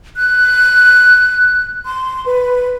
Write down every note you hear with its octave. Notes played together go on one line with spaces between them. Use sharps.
F#6
C6
B4